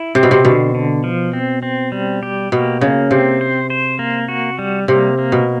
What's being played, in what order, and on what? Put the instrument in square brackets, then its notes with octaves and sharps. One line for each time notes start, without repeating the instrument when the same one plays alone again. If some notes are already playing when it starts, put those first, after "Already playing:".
Already playing: [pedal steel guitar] E4
[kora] C3 [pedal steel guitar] C4
[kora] B2
C3
[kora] B2 [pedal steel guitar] D3
[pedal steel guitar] D3
F3
C4
C4
G3
G4
[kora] B2 [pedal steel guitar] A#3
[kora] C#3 [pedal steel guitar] A#3
[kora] C3 [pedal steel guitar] C4
[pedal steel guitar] C5
C5
A#3
F#4
G3
[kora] C3 [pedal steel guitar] A#3
[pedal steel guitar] A#3
[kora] B2